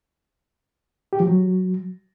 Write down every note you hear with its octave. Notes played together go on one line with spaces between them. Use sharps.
G4
F3
F#3